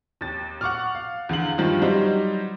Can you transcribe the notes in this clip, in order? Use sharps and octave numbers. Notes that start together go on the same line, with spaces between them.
D#2 A6
F#5 C#6 D6 F6
F5
E2 D3 F5 F#7
G2 D#3 F3 F4
F#3 G3 D#4 C5